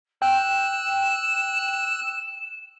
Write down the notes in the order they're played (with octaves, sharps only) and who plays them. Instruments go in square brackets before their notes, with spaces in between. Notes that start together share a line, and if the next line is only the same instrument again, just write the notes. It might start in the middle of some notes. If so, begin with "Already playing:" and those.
[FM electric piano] G5 [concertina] E6 F#6 [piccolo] E7